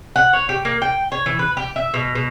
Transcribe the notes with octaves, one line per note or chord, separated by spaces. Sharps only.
F#5
C#5
G4
A#3
G5
C#5
E3
B4
G4
E5
B2
B2